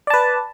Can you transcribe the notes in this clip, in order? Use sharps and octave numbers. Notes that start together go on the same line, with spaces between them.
B4 D5 A5